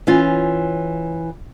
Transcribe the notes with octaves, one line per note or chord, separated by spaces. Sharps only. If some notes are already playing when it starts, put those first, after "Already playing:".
E3 C#4 F4